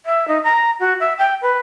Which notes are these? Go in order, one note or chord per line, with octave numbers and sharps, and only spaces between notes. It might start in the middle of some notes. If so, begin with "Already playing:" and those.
E5
D#4
A#5
F#4
E5
G5
B4